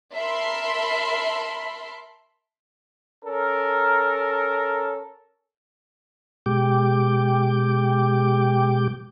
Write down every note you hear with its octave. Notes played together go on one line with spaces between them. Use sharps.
A#4 E5 A5 B5 C6
C#4 A4 A#4
B2 G#3 G4 G5 D6